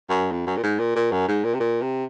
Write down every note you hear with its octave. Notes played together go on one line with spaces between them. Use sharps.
F#2
F2
F#2
A#2
G#2
A#2
A#2
F#2
G#2
A#2
C3
A#2
C3